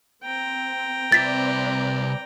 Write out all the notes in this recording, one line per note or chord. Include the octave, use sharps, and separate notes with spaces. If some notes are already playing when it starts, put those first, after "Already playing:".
C4 G5 A#5
C2 C4 B4 D5 E5 A6 B6